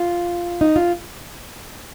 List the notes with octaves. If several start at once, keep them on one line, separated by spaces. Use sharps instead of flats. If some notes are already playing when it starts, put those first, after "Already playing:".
Already playing: F4
D#4
F4